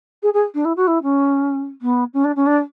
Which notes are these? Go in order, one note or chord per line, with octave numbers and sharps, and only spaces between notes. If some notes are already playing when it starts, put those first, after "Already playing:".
G#4
G#4
D4
E4
F#4
E4
C#4
B3
C#4
D4
C#4
D4